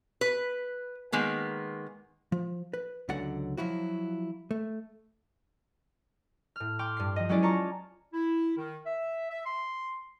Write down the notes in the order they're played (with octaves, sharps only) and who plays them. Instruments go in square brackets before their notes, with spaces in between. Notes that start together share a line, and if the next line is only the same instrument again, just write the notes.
[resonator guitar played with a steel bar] B4
D#3 G#3 A#3 B3
[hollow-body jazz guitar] F3
B4
C#2 D3 F#3 D5 F#5
F3 F#3 E4 F#4
A3
[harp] A2 F6
G5 C6 D6 F6
G2 C7
F3 D#5
F#3 G#3 C#4 E4 G#4 D5
F4 C#5 A5 A#5 C#6
[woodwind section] E4
D#3
E5
E5
C6